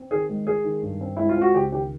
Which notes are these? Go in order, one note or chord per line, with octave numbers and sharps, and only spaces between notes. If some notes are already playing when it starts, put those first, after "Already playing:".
Already playing: C4
D#3 G#4
G#3
G#3 G#4
D#3
G2
C4
G#3 E4
F4
C4
F#4
C#2 G4
D#3 G4